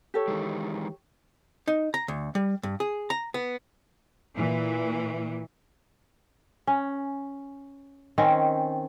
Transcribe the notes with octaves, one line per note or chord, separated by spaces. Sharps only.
G4 A4 C#5
D#3 E3 G#3
D#4
A#5
D2
G3
G2
G#4
A#5
B3
A#2 E3
C#4
D#3 C4 C#4